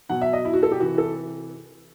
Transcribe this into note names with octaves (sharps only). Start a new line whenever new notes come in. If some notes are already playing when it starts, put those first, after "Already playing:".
B2 F#3 F#5
E5
D#5
E4
F#4
A4
G4
C3 E3 F#4
A4